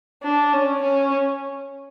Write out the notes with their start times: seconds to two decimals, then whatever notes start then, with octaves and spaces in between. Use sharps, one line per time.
0.23 D4
0.53 C#4
0.82 C#4